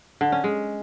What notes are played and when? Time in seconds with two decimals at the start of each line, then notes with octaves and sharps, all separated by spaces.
0.21 D3
0.32 C#4
0.44 G#3